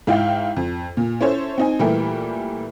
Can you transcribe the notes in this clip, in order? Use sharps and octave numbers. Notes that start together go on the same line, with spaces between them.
G#2 E4 F5 G5
F2
A#2
C#4 E4 A4 C5 C#5
C4 D#4 G#5
A#2 E3 G3 A3 G4 A#4